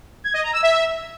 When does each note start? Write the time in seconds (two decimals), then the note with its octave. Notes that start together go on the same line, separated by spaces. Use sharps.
0.24 G#6
0.34 D#5
0.43 A#5
0.53 E6
0.63 E5